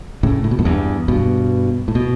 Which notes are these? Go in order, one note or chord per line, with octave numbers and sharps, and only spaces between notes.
A2 C#3
A2
B2
F#2 A2
E2 G2
G2 B2
A2
B2